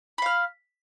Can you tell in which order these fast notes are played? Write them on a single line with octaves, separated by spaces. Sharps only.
B5 F5 F6